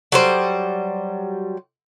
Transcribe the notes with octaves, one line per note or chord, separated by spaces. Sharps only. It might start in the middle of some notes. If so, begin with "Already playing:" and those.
F#3 G3 C5